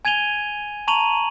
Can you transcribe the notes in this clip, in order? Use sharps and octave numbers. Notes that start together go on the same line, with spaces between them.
G#5 G#6 D#7 F7 G7
A5 A#5 C#6 D#7 F7 F#7